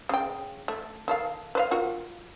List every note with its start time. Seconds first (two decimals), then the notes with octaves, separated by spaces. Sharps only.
0.09 C#3 G5
0.68 A3
1.08 D#3 A4 F5
1.55 B4 C5 F5
1.71 F4 F#4 A#4